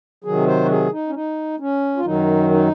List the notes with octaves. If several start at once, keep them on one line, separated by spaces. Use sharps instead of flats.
C3 D#3 F#3 G#4
C5
F#4
G#4
D#4
C#4
D#4
C#4
F4
F#2 D#3 F#3 D#4
D#4